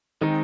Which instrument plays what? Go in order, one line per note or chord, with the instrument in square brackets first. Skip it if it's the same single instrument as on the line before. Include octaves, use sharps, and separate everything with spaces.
[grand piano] D#3 [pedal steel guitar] G#3 C4 D#4